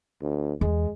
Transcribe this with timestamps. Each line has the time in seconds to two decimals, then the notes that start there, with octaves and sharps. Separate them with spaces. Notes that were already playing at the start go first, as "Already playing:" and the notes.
0.22 D2
0.61 E2 G#3